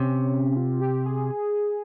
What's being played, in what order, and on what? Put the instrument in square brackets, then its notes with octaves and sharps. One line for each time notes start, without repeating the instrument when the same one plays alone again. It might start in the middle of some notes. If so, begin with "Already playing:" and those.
Already playing: [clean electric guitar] C3 [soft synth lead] C#4
[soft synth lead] F4
G4
G#4